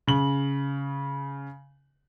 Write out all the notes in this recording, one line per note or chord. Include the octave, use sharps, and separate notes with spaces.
C#3 F#7